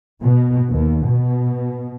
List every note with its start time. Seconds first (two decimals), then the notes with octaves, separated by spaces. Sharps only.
0.23 B2
0.71 D#2
1.08 B2